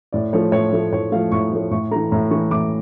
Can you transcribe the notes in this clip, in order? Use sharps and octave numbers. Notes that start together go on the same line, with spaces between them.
A2 D5
F3 A3 C#5
A2 C#5
F3 A3
A2 C#5
F3 A3 F5
A2 C#6
F3 A3
A2 C#6
E3 A3 A#5
A2 A#5
E3 A3 C#6
A2 D6